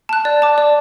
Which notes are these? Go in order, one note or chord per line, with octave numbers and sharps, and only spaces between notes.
A5 F#6
D5
A5 D6
D5